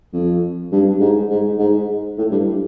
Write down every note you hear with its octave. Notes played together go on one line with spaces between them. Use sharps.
F2
G2
G#2
G#2
G#2
A2
G2